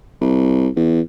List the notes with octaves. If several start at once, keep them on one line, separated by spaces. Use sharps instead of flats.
C2
E2